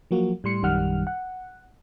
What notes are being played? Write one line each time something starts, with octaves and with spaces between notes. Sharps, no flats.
F3 F#3 A#3 F#4
A2 G3 C6 C#7
A#1 F#2 D#3 G3 F#5 F6
F#5